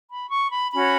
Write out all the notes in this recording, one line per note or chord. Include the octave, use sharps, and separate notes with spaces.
B5
C#6
B5
C#4 F#4 C#5 B5